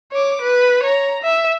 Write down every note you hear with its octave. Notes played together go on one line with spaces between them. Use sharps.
C#5 D6
B4
C#5 A#5
E5